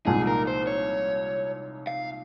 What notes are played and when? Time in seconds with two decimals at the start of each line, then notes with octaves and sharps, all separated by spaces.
0.06 C2 A#2 F3 G#3 D#4 G#4
0.27 A#4
0.47 C5
0.67 C#5
1.87 F5